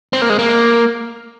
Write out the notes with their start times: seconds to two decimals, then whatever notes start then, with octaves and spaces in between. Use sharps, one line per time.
0.13 C4
0.22 A#3
0.30 G#3
0.39 A#3